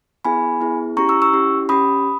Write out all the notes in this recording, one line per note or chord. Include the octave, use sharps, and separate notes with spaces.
B3 E4 G#4 G#5 B5
B3 E4 G#4
C#4 E4 G4 A#5 C#6
C#6 E6
C#6 E6
C#4 E4 G4
C#4 G4 B5 D#6